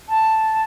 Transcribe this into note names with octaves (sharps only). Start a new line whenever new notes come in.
A5